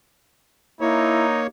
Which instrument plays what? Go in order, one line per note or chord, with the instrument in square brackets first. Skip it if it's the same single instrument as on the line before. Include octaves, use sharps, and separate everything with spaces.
[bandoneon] A#3 C#5 [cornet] D#4 [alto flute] E4